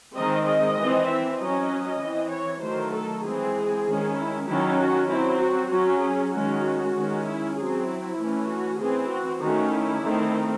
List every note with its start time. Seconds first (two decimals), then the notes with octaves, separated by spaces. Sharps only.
0.17 D#3 G#3 C4 D#5
0.48 D#5
0.78 E3 C4
1.10 E5
1.40 F#3 C#4 D#5
2.01 E3 C4
2.33 C#5
2.64 D#3 F#3 A3 C5
2.95 A4
3.25 E3 G#3 C4 G#4
3.87 D#3 G#3 C#4
4.18 E4
4.49 D#3 F#3 C#4 E4
4.80 F#4
5.10 F#3 C4 E4
5.41 F#4
5.72 F#3 C#4 F#4
6.02 G#4
6.34 D#3 G#3 C#4 F#4
6.95 D#3 G#3 C#4
7.26 E4
7.57 F#3 C4 G#4
7.88 E4
8.19 E3 A3 C#4
8.49 F#4
8.80 E3 C4 G#4
9.11 F#4
9.43 D#3 A3 C#4 F#4
9.73 E4
10.04 D#3 A3 C4